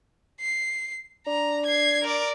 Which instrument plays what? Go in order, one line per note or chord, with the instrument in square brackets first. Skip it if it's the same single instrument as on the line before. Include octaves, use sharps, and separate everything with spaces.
[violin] C7
[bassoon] D4 [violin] A#5
[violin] G#6 C7
A#4 D5